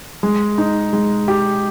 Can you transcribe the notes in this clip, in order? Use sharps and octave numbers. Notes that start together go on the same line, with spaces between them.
G#3
D#4
G#3
G4